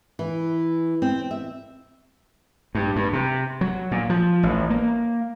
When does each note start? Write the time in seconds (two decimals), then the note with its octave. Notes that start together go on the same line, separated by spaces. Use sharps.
0.19 E3
1.02 C4
1.31 E5
2.75 G2
2.96 G2
3.13 C3
3.61 F#3
3.91 A#2
4.10 F3
4.43 A1
4.70 A#3